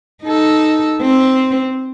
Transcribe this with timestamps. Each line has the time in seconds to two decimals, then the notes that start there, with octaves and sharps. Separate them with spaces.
0.24 D#4 A4
1.01 C4